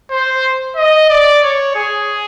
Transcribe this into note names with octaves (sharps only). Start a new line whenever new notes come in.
C5
D#5
D5
C#5
G#4